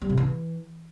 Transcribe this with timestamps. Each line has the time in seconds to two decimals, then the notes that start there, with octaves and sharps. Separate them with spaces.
0.02 G3
0.09 C3
0.17 E3